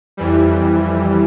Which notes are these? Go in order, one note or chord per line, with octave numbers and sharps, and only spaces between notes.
F2 E3 G3